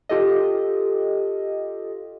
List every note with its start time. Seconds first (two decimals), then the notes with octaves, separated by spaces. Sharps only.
0.09 F4 G4 A4 D#5